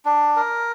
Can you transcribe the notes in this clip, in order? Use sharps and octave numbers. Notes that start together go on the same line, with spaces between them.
D4
A#4